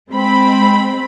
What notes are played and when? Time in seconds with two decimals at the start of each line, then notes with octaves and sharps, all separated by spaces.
0.10 G#3 C4 B5